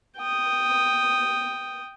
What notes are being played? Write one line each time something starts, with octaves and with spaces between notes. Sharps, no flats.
G5 D#6